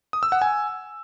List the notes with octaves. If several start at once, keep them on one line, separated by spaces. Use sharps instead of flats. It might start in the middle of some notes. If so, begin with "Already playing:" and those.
D#6
E6
F#5
G#5